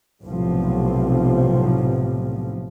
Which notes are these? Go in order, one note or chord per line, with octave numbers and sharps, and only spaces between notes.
B1 A2 C3 F3